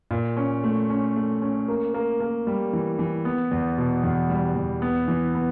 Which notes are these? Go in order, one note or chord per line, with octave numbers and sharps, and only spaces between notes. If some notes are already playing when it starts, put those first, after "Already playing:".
A#2
C#4
A3
C#4
A3
C#4
A#3
A#3
A#3
G3
E3
E3
B3
E2
B2
E2
G3
E2
B3
E3
B3